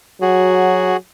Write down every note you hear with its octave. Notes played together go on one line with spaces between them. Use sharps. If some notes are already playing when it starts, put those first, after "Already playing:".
F#3 F#4 G#4